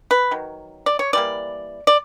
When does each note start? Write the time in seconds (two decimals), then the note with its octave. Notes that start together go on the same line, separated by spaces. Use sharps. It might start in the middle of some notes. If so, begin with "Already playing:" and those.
0.11 B4
0.31 D#3 F#3
0.86 D5
0.99 C#5
1.13 E3 G3 A#3 D5
1.87 D5